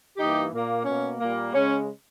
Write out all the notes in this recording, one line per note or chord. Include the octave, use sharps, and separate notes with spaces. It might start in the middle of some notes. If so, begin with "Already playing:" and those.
G2 E3 A#3 D#4 G4
A#2 A#3
B2 A#3 C#4
A#2 G3 A#3
C#3 G#3 C#4